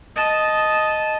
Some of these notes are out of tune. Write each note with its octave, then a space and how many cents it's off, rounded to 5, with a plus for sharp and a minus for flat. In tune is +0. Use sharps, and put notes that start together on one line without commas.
D#5 +0 A5 -15